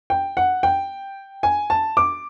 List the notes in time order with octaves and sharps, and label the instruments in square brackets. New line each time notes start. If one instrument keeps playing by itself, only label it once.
[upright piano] G5
F#5
G5
G#5
A5
D6